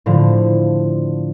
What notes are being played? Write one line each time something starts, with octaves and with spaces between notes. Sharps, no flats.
A2 D3 F3